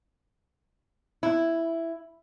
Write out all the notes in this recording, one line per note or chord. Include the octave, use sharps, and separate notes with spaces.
E4